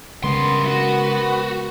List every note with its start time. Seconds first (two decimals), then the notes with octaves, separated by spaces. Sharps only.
0.24 G2 C#3 G#3 B3 A#4 C6
0.67 F#4